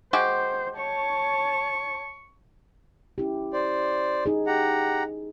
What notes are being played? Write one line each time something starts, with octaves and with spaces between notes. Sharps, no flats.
G#3 F#4 G4 C5
C#5 A5 C#6
C#4 E4 G4
C5 D5
D#4 G#4
G4 F#5 A#5